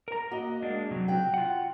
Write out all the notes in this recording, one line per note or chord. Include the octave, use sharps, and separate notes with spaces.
A#4 A#5
A#3 F#4 D#5
G#3 A#3 D4
C3 F#3
F#4 G5
F4 F#5